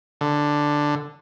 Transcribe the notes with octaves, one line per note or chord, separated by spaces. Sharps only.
D3